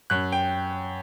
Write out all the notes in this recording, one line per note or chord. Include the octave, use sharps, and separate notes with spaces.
F#2 F#6
G5